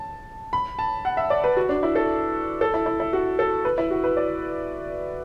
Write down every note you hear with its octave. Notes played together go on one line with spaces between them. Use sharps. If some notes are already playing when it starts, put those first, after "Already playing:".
Already playing: A5
B5
A5
F#5
E5
D5
B4
F#4
D4
E4
A4
A4
E4
E4
E4
F#4
A4
B4
E4
F#4
B4
D5